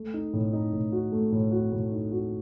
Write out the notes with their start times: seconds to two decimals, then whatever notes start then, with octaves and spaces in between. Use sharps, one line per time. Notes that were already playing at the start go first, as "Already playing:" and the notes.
Already playing: A3
0.14 D#4
0.33 A2
0.53 D#4
0.73 A2
0.92 F#4
1.12 A3
1.32 A2
1.52 F#4
1.72 A2
1.92 D#4
2.12 F#4